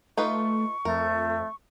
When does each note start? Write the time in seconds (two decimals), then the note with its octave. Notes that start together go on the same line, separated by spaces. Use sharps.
0.17 A3 D#4 F4 B4 C#6
0.85 F2 A3 A#4